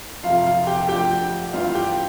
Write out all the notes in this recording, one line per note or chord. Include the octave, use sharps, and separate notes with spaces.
F2 C3 F3 F4 F5
F4 F5
G4 G5
D2 D3 F3 G4 G5
G2 E3 F4 F5
G4 G5